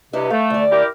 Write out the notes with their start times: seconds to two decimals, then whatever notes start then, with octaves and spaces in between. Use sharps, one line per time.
0.13 G2 C3 E4 B4 D#5
0.30 A3 F5
0.50 D2 D5
0.71 E4 G4 A#4